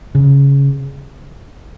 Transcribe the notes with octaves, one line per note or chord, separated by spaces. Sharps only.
C#3